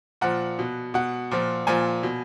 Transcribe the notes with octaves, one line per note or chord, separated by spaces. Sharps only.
A#2 F3 F#5
B2
B2 F#5
A#2 F3
A#2 F3 G#5
B2